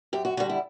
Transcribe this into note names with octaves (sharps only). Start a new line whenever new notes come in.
F#2 G4
F#4
D3 G3 F#4
E4